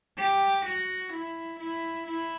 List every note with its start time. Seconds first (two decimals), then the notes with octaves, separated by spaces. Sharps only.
0.18 G4
0.65 F#4
1.13 E4
1.60 E4
2.07 E4